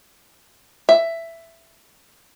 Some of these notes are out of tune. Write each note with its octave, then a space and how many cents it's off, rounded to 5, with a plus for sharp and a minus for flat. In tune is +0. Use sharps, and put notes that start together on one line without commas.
E5 +10